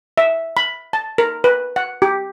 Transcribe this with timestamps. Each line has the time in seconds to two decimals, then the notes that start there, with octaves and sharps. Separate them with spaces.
0.17 E5
0.57 B5
0.93 A5
1.18 A#4
1.44 B4
1.76 F#5
2.02 G4